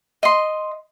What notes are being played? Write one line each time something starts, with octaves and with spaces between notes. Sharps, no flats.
D#5 C6